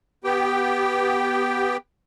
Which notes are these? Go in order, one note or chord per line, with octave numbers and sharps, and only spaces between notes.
B3 G4 G5